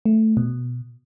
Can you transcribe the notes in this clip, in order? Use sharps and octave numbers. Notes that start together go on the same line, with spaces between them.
A3
B2